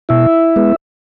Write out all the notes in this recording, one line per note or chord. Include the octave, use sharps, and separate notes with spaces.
B2 E4 E5
G#3 B3